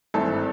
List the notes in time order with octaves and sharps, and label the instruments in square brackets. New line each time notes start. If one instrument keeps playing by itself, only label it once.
[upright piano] G#1 G2 E3 A3 C4 A4